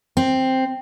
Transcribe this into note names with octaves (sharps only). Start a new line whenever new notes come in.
C4